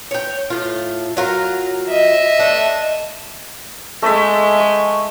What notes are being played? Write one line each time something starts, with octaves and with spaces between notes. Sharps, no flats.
C#5 G5
A2 F4
F#3 F4 A#4
D#5 E5
A3 D4
G#3 A3 E5
C#6